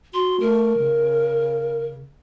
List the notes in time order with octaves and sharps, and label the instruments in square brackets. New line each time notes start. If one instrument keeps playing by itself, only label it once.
[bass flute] F#4 [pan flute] C6
[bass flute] A3 [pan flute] A#4
[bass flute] C#3